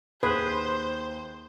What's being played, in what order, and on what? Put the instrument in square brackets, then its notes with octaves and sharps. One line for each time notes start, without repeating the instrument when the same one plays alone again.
[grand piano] D#2 [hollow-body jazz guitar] G#4 [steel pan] B4 [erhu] C5